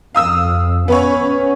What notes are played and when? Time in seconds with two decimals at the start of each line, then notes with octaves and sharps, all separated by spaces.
0.15 F2 F5 D#6 E6
0.88 B3 C#4 B4 C#5